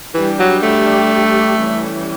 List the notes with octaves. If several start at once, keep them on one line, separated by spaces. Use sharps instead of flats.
E3 G3 D4 G4
F#3
A3
E3 G3 C#4